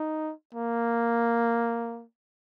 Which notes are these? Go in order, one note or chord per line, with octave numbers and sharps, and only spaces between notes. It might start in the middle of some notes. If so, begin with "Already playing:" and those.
Already playing: D#4
A#3